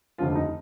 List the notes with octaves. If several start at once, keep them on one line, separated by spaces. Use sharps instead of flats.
F1 D#2 D3 F3 F4
D#4